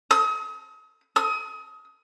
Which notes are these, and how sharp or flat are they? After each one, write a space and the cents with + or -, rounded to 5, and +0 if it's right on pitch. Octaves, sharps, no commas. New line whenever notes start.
D#6 +40
D#6 +30